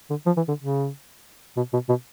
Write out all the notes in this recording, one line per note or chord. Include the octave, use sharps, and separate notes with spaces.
D3
F3
E3
D3
C#3
B2
B2
B2